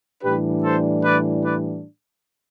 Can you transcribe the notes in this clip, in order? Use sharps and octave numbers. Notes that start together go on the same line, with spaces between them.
A2 E3 G3 D4 G4 B4
A4 C5
B4 D5
B4 D5